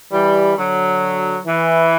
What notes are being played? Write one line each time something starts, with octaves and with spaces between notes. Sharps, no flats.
E3 G3
D3 F#3
E3